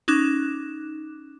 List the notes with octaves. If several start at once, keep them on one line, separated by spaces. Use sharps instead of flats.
C#4 D#4 D6 F#6 E7